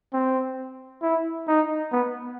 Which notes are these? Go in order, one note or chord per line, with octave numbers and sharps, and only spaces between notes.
C4
E4
D#4
B3